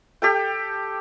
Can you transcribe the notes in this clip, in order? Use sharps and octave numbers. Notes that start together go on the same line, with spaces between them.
G4 A4 G5